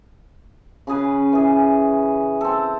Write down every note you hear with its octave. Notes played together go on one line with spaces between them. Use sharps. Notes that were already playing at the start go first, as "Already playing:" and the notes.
C#3 C#4 G#4 B4
E3 G#4
C4 A4